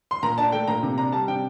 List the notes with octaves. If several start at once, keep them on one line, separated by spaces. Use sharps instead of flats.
C6
A#2 A#5
D4 A5
A3 G5
A#2 A#5
C3
D4 A#5
G3 A5
C3 G5